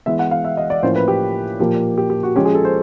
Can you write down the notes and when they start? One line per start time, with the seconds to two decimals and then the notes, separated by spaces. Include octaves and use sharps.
0.06 E3 G#3 B3 E5
0.19 F#5
0.31 F5
0.45 E5
0.57 D#5
0.70 D5
0.83 A2 F3 A#3 C#4 E4 C5
0.96 B4
1.08 G4
1.60 A#2 F3 A#3 G4
1.98 G4
2.10 G4
2.23 F#4
2.36 F3 G#3 C#4 G4
2.45 G#4
2.55 A4
2.65 C5